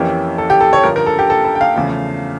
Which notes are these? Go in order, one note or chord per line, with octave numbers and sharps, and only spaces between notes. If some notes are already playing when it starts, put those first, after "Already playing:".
Already playing: F2 E3 A#3 C#4 G4
A4
G4
A4
C#5
G2 D3 F3 A#4
A#4
A4
G4
A4
A4
G5
F5
E2 C#3 F3 A3